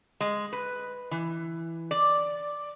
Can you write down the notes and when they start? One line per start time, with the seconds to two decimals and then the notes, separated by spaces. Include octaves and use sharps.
0.20 G#3
0.53 B4
1.11 E3
1.91 D5